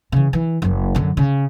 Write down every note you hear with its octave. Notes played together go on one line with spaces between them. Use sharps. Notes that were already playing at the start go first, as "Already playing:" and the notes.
C#3 E3
E3
F#1 F#3
F#2 D3
C#3